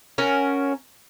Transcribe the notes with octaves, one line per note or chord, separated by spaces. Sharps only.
C#4 F#4 A#4